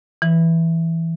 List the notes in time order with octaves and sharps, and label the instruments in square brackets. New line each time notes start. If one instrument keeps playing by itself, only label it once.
[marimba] E3